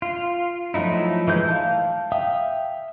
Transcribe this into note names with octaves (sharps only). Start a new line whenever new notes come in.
F4
F3 F#3 A3 D#4 E4
E3 G#3 G6
F5 A5
E5 F5 G5 D#6